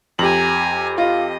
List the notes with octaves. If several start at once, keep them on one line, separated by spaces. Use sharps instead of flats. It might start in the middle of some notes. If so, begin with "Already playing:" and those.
F2 G4 G#5 A#5 F#7
F4 D#5